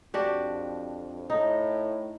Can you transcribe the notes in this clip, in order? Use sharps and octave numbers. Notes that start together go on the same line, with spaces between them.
F2 D4 F#4 G4
A2 D#4